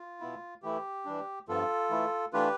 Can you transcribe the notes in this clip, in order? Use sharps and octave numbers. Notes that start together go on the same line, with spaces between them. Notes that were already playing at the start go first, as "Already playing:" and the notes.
Already playing: F4
B2 B3 E4
E3 A3 E4 G4
E3 G3 D4
G2 F3 B3 F4 A4
E3 A3 E4
E3 A3 D4 F4 G4 B4